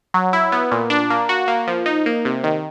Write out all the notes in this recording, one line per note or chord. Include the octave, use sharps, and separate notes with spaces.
F#3
E4
B3
A#2
D4
A#3
F#4
A#3
F3
D#4
A#3
C3
D#3